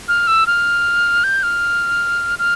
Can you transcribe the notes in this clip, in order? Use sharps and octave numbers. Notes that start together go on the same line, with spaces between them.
F6
E6
F6
G6
F6
F6